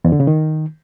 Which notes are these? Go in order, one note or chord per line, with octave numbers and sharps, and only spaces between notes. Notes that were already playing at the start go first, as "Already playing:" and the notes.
E2
D3
C#3
D#3